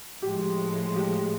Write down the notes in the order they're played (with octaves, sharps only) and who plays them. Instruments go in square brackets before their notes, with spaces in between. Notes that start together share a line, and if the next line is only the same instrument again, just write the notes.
[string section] A2 F3 G#3 [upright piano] G4
[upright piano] G4